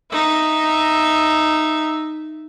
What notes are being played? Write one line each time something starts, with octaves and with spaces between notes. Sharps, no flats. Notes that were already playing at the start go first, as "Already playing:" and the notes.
D#4 E5